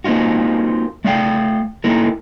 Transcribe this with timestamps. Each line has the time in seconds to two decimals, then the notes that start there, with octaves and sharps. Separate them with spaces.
0.04 A#3 C4 D#4 F4 F#4
1.05 A3 D5 F5 G5
1.84 A3 A#3 D#4 E4 A#4